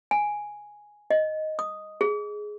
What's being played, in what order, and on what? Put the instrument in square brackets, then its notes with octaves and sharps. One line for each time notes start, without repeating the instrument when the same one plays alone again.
[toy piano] G#5
D#5
D#6
G#4